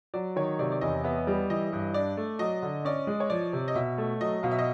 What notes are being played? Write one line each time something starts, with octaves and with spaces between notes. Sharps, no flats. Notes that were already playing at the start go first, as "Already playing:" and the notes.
F#3 D5
D#3 C#5
C3 D5
D5
E2 D#5
B3 E5
G3
E3 D#5
G2
D4 D5
A3
F#3 D#5
D3
C#4 D5
G#3
C#5
F3 D5
C3
D#5
B2 E5
A3
F#3 D#5
B2 F5
E5
D#5